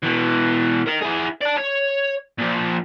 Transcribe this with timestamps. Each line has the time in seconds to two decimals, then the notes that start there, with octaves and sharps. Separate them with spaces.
0.03 B2 E3
0.86 A#4 D#5
1.01 E4 G#4
1.41 D5 A5
1.57 C#5
2.38 A#2 F3